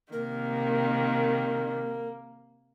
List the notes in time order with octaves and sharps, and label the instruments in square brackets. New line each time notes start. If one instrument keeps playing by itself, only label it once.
[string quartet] C3 D#3 [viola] A#3 [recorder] A#4